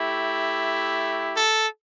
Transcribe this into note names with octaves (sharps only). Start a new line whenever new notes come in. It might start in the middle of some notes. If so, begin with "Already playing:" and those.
Already playing: A3 E4 G4
A4